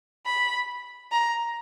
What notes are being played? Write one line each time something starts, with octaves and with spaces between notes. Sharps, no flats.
B5
A#5